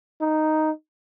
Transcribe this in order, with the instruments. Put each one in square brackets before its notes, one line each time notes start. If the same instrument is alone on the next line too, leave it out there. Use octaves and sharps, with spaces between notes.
[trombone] D#4